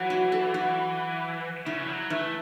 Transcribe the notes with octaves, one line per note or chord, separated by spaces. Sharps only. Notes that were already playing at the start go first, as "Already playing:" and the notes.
Already playing: E3 F#3
F#4
A4
F#4
C#3 E4
E3
F#3
E3 A3